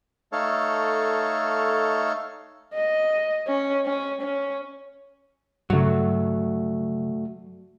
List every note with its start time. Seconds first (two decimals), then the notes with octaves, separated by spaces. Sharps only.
0.32 A3 D#4 A4 C#5 F5
2.74 D#5
3.48 C#4
3.86 C#4
4.22 C#4
5.70 G2 C#3 F#3 A3 F#4